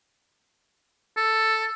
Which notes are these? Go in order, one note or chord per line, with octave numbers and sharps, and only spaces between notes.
A4